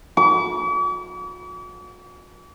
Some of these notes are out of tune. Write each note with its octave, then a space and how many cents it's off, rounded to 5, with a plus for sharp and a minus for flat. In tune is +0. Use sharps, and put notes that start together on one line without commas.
D6 -45